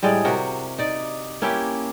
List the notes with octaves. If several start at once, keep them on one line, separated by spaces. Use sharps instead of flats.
A2 G3 G#3 D5
C3 F#4 A#4
D#4 D5
A#3 C#4 E4 G4